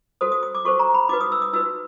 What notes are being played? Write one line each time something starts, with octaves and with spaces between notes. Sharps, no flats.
F#4 A4 C5 D#6
D#6
D#6
D6
F#4 A4 C5 C#6
A#5
B5
D#4 F#4 B4 D6
D#6
E6
D#6
D#4 F#4 B4 E6